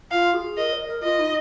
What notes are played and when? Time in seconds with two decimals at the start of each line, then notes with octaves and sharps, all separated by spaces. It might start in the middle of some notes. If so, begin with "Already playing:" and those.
0.11 F4 F5
0.34 G#4
0.57 A#4 D#5
0.73 D#5
0.87 A#4
1.03 F4 D#5
1.19 D#4